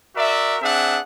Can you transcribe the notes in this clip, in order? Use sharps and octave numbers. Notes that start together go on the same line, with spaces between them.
F#4 A#4 D5 E5
C4 D4 G#4 E5 F#5